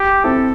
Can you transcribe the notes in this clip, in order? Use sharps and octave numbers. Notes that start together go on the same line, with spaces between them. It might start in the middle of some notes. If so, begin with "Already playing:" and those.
Already playing: G4
C4 E4 A4